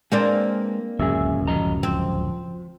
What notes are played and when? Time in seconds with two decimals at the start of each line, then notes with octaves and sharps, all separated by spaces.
0.12 G#3 A#3 C4 D4 B4
0.99 D1 C#2 F#2 G#4 E5
1.47 F3 D#5 A#5
1.83 F3 C4